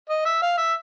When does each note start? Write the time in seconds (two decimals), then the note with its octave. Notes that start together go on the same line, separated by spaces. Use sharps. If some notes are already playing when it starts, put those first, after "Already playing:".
0.09 D#5
0.25 E5
0.42 F5
0.58 E5